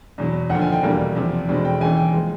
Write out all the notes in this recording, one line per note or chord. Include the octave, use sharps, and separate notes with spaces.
E2 B2 F#3
D#2 D3 F3 F#5
G#5
G5
F1 E2 B2 G3 A#3
E2 C3 F3
F1 E2 B2 G#3 C4
G5
D#2 C#3 E3 G#5
G5
F3 G#3 B3